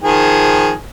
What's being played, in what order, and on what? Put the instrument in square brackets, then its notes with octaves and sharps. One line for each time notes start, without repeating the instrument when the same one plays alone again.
[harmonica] D#3 F3 G#4